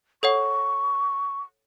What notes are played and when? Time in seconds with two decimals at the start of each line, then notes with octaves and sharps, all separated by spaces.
0.23 A4 C#5 F#5 C#6